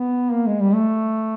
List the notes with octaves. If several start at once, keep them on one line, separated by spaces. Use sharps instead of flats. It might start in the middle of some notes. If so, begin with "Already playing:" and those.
Already playing: B3
A#3
G#3
G3
A3